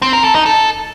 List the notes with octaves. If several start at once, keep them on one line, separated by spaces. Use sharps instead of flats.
C4
A#4
A4
D#4
A4